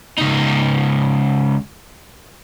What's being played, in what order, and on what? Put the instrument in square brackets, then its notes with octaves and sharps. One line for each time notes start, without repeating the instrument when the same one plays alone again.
[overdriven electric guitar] C#2 D#4